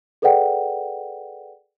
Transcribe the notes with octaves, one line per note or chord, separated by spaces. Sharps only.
G#4 A4 B4 D5 F#5 G5